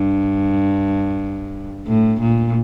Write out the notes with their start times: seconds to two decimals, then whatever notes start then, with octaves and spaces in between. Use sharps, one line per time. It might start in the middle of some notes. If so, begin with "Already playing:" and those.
Already playing: G2
1.87 A2
2.20 A#2